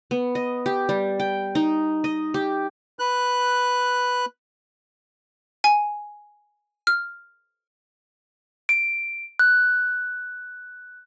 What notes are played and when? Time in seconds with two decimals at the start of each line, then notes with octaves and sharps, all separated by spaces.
0.11 B3
0.35 D#5
0.66 G4
0.89 G3
1.20 G5
1.55 D#4
2.04 D#5
2.34 G4
2.99 B4 F#6
5.64 G#5
6.87 F6
8.69 D7
9.39 F#6